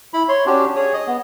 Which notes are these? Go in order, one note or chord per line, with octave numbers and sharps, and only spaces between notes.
E4 B5
C#5 C6
C#4 D4 F#4 G4
G#4 C#5 D#6
D#5 D#6
B3